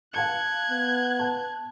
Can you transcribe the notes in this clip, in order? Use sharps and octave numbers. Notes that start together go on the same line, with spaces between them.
F5 A5 F#6 G#6 C#7
B3
A5